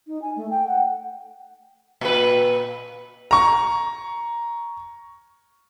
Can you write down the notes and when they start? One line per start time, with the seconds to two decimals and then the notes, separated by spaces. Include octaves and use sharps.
0.07 D#4
0.21 G#5
0.36 A3
0.50 G5
0.67 F#5
2.01 A#2 B4
3.31 A#5 C#6